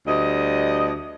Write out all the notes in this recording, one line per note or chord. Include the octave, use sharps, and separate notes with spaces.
D2 G3 D#5